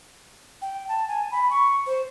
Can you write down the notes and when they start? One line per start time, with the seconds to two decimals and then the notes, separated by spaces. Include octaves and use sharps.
0.62 G5
0.88 A5
1.08 G#5
1.31 B5
1.50 C#6
1.87 C5